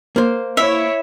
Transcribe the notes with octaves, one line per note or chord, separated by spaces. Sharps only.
A#3 C5
E4 C#5 E5